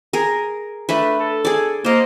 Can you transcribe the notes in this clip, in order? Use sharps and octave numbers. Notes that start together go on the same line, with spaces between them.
G#4 A#4
A3 D4 B4
A4
G#4 D5
A#3 C5 D#5